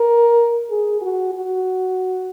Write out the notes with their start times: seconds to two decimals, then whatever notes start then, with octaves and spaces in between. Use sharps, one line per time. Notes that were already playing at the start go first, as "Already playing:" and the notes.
Already playing: A#4
0.70 G#4
1.01 F#4
1.34 F#4